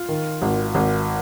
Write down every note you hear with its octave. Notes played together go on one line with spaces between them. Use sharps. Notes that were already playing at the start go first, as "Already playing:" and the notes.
Already playing: F4
D#3
G#1
G#1